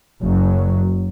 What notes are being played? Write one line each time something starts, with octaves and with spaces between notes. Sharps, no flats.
F#1 F#2 F#3